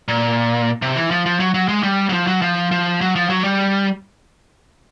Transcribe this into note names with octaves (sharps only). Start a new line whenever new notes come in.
A#2
C3
E3
F3
F3
F#3
F#3
G#3
G3
F#3
F3
F#3
F3
F3
F#3
F3
F#3
G3